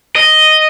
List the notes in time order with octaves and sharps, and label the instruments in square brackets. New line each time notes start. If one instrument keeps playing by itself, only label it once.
[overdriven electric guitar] D#5